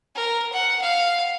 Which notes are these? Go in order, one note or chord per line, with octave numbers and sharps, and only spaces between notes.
A#4
F#5
F5